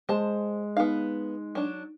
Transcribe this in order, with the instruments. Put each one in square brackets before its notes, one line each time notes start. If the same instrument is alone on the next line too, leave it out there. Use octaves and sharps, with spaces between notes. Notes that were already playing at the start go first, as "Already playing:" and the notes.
[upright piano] G#3 [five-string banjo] C5 A5
[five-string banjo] B3 F5 [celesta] D#4
[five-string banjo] F#3 D4